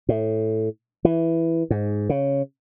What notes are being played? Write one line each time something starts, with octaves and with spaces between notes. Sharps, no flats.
A2
E3
G#2
C#3